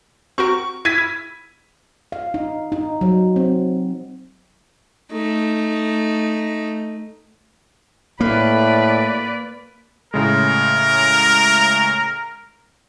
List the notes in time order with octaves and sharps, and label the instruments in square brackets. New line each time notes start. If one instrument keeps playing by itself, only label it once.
[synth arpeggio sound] C4 F#4 A#4 [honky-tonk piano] C#6
[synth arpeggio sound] E4 [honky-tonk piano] G#6 B6 D#7
[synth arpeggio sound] E4
[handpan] F5
D#4
D#4
F#3
C4
[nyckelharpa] A3 D#4
[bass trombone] A2 [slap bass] A#3 [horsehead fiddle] B4 D5
[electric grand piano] A2 C#3 G#3 [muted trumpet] A#4